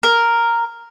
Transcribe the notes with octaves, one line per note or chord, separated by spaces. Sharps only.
A#4